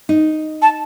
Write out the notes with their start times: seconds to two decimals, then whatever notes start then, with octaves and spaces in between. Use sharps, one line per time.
0.09 D#4
0.62 A5